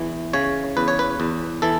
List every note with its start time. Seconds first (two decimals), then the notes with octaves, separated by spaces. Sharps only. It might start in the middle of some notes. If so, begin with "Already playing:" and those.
Already playing: E2 E3
0.33 C#3 C#5
0.77 E2 B4
0.88 C#5
0.99 B4
1.20 E2
1.62 E3 A4